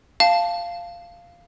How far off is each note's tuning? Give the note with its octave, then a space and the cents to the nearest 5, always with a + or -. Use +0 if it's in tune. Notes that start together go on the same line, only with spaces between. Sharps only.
F5 -5 A5 +0